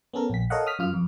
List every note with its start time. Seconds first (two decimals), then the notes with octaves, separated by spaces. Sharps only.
0.13 B3 C#4 A4 A#4
0.30 A#1 B6
0.50 A4 A#4 C#5 D#5 F5 F#5
0.67 D#6 F6 B6
0.79 F#2 F4 F6
0.93 F2